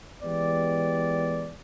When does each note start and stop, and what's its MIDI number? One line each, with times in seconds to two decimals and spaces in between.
0.23 1.52 52
0.23 1.52 56
0.23 1.52 59
0.23 1.52 67
0.23 1.52 74